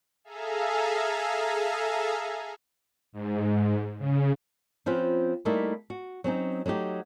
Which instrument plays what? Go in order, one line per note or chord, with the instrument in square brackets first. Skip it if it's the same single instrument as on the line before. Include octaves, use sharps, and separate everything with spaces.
[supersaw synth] G#4 A4 E5 F5 G#5 A#5
[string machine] G#2
C#3
[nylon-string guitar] F3 C4 C#4 F4 B4
G3 A3 A#3 D#4 E4 A4
F#4
F#3 C4 C#4 D#4
F#3 A3 D#4 G4